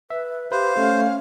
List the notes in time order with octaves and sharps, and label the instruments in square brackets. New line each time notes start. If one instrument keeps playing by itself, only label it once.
[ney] B4 [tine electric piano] E5
[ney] G4 [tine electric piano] B4 [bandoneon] C5 [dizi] F5
[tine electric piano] A3 [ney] C#4